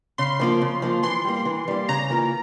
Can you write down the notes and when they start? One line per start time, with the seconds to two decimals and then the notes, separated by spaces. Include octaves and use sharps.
0.18 C#3 C6
0.40 F3 A#3 F4
0.61 C#3
0.82 F3 A#3 F4
1.03 E3 C6
1.24 G3 A#3
1.45 E3
1.68 G3 A#3
1.88 C#3 A#5
2.10 E3 A#3 F4